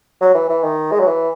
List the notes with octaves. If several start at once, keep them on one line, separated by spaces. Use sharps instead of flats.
F#3
E3
E3
D#3
G#3
F#3
E3